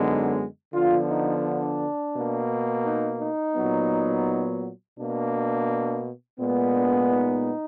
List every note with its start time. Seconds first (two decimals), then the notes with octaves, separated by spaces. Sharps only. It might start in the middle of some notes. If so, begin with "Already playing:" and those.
Already playing: F#2 D3 G#3 B3 D#4
0.73 D3 F3 B3 F4
1.09 D#4
1.44 D4
2.14 B2 A#3
2.86 D#4
3.21 D#4
3.56 A#2 F#3 B3
4.97 B2 A#3 D4
6.39 A#2 G#3 B3
6.74 D4
7.09 D#4